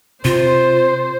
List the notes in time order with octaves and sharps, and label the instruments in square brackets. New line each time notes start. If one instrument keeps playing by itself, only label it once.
[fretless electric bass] C3 [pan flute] F4 [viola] C5